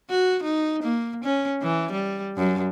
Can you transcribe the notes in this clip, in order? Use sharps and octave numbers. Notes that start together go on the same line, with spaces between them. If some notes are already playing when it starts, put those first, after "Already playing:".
F#4
D#4
A#3
C#4
E3
G3
F#2